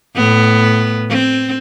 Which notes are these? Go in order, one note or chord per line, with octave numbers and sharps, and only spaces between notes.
A2 B3
C4